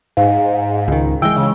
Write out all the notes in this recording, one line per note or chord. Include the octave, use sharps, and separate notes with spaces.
G#2 F5
C#2 D#3
E3 G#3 G5 E6
C#3